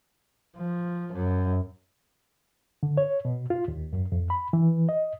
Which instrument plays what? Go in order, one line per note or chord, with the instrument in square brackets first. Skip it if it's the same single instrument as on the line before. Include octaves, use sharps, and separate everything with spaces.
[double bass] F3
F#2
[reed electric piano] D3
C#5
B2
F4
D#2
F#2
F2
B5
E3
D#5